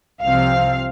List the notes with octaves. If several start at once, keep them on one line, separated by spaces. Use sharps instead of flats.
C2 C3 F3 C4 F5